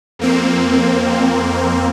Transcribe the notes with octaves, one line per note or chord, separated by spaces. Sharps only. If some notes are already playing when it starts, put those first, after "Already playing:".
F2 A#3 C4